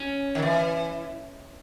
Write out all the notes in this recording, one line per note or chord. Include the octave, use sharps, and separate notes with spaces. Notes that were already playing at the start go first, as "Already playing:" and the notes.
Already playing: C#4
D#3
E3